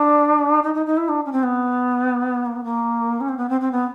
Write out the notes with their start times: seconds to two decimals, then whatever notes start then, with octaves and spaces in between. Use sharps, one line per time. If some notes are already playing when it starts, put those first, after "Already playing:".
Already playing: D4
0.62 D#4
0.74 D#4
0.86 D#4
0.97 E4
1.08 D4
1.25 C#4
1.32 C4
1.43 B3
2.45 A#3
2.55 B3
2.64 A#3
3.20 C#4
3.28 C4
3.37 B3
3.49 C4
3.60 C4
3.71 B3